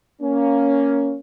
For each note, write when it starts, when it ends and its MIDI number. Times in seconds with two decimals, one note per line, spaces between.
0.22 1.17 58
0.22 1.17 61